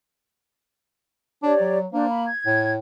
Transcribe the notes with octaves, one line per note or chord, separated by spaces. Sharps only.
D4 G4 C#5 D5
F#3
A#3 D4 C5
B5
G#6
A2